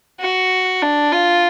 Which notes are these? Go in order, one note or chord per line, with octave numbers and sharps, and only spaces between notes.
F#4
D4
F4